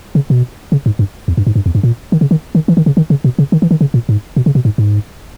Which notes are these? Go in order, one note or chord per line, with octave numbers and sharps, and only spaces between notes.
C#3
B2
C#3
G#2
G2
E2
G2
G#2
G2
E2
G2
A#2
D#3
C#3
D#3
D#3
E3
D#3
C#3
D#3
C#3
B2
C#3
D#3
E3
D#3
C#3
A#2
G#2
B2
C#3
B2
G#2
G#2